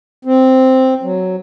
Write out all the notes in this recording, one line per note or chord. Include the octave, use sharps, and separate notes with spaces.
C4
F#3